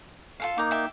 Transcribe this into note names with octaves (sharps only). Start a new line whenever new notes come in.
F4 A4 F5
A#3 D#4 A#5 D6
E5 G5 D6